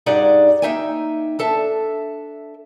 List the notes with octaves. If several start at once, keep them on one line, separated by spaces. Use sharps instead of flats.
G2 D#4 G4 G#4 D5 F#5
A#3 B3 D#4 E5 G5 G#5
D4 A4 E5 A5